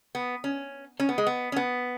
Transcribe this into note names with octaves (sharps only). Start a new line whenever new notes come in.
B3
C#4
C#4
B3
G#3
B3
C#4
B3